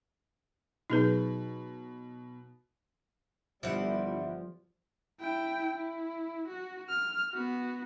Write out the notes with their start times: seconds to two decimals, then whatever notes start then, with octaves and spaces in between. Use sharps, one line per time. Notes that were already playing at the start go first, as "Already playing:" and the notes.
0.90 B2 F#3 D#4 G#4 B4
3.63 G1 E3 F3 G3 F#5
5.20 E4 G5
5.76 E4
6.48 F#4
6.89 F6
7.33 B3 F#4